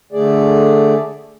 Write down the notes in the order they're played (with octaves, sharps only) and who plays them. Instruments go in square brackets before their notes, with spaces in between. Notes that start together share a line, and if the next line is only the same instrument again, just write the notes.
[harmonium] D3 A3 G#4 D5